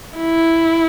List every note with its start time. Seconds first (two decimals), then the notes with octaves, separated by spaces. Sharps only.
0.18 E4